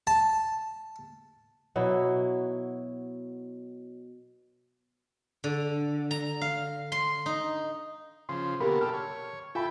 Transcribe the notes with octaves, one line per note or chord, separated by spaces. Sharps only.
A5
B2 F#3 E4
D3
A#5
F5
C6
D#4
C#3 F3 C6
B2 D3 A#3 G4 A#4 B5
G4 A4 A5 F6
C#5
F4 A4 E5 G5 G#5 B5